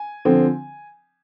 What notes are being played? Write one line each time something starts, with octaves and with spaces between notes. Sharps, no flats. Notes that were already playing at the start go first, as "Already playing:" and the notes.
Already playing: G#5
D3 F3 C4